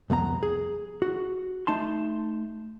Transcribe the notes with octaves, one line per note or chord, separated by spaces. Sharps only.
C2 F2 B3 A#5
G#4
F#4
A3 D#4 A5 C6